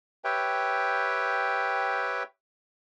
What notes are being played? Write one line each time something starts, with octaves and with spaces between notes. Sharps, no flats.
G4 B4 C#5 E5 G5